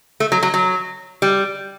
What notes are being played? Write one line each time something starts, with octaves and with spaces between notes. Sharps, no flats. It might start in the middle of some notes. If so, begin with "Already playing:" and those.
A3
F#3
F#3
F#3
G3